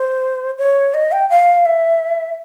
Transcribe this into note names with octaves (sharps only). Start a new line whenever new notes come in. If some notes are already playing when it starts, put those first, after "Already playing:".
Already playing: C5
C#5
D#5
G5
F5
E5